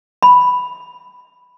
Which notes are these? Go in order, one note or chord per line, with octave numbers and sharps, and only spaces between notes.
B5